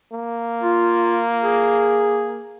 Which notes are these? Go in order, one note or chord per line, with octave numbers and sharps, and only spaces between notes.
A#3
F4
G#4